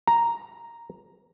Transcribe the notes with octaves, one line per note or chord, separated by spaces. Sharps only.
A#5